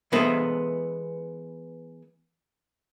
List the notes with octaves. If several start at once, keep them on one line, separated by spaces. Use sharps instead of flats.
E3 G#3 B3 A4 C5